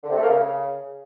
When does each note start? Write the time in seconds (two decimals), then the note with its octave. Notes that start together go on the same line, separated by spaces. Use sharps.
0.04 D3
0.10 C3
0.17 A3
0.23 A#3
0.29 C#3